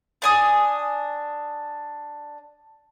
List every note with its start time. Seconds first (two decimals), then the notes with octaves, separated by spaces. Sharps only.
0.22 D4 G#5 D#6